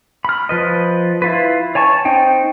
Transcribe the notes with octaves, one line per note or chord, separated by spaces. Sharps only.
B5 F6
F3 B4 D#5
E4 F4 B4
C#5 G#5 A5 C#6
C4 D#4 G5